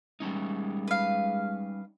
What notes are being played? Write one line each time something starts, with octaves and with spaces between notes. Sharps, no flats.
G3 G#3 C#4 D#4
B4 F5